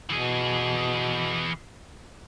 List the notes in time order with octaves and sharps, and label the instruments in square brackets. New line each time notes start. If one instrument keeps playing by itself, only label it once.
[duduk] B2 [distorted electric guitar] E3 G#4